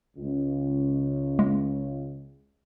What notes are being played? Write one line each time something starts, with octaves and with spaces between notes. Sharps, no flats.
C#2
G#3